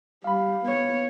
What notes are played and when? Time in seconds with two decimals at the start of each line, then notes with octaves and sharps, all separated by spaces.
0.24 G3 F5 B5
0.65 B3 C#5